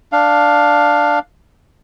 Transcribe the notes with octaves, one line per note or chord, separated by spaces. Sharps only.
D4 F5